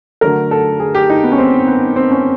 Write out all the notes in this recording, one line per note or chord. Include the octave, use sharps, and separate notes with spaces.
D3 F#3 A3 A#4
A4
G#4
G4
D#4
B3
C#4
C4
B3
C4
C#4